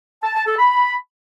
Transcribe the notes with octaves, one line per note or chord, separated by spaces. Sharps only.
A5
A5
A4
B5